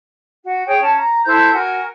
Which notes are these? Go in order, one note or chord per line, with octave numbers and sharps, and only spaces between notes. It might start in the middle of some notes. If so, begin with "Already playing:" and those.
F#4
G#4 C#5 G5
C#4 A5
A#5
E4 A4 C5 G6
F#4 A#4 G#5